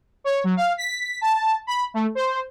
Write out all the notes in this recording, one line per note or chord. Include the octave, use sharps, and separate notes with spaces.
C#5
F#3
F5
B6
A5
B5
A3
C5